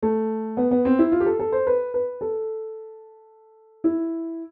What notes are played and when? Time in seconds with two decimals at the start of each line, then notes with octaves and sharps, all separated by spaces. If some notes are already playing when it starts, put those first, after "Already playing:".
0.03 A3
0.57 B3
0.71 B3
0.85 C4
0.99 E4
1.12 F4
1.20 G4
1.26 A4
1.39 A4
1.52 C5
1.67 B4
1.94 B4
2.21 A4
3.84 E4